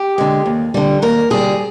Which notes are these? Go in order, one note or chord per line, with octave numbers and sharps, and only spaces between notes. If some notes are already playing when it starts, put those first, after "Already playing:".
Already playing: G4
D3 G#3
D#2
D3 G3
D#2 A#4
D3 G3 G#4